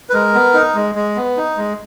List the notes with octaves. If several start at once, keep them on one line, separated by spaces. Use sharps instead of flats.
B4
G#3 A#4
B3
D#4
G#3
G#3
B3
D#4
G#3